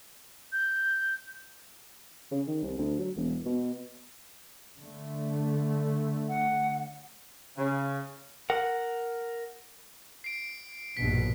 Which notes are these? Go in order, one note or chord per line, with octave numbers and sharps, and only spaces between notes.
G6
C#3
D#3
C2
D2
F#3
E1
B2
D3 A3
F#5
C#3
A#4 F#5
C7 D7
A#1 G2 B2 B6